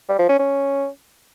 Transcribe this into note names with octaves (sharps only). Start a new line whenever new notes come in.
G3
F3
C#4
C#4